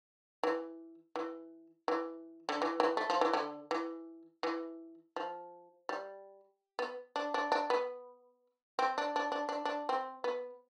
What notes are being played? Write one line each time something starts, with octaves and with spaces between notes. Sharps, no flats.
E3
E3
E3
D3
E3
E3
A3
F3
E3
D3
E3
E3
F3
G3
B3
D4
D4
D4
B3
C4
D4
D4
D4
D4
D4
C4
B3